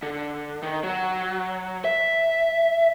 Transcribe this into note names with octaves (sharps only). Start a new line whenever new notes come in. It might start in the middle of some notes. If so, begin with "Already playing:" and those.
D3
D#3
F#3
E5